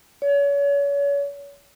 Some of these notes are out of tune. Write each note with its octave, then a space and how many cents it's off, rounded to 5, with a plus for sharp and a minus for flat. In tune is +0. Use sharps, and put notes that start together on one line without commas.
C#5 +35